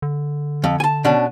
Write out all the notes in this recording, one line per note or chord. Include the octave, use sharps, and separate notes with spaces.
D3
F2
G#5 A5
B2 C#4 D4